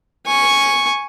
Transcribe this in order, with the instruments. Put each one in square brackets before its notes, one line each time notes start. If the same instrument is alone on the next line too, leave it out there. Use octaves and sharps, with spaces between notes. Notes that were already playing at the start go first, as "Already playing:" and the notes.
[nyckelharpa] G#5 C#6